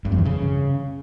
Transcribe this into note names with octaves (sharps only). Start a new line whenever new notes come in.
G2
F2
E3
C#3